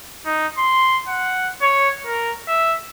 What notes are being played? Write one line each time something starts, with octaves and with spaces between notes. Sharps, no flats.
D#4
C6
F#5
C#5
A#4
E5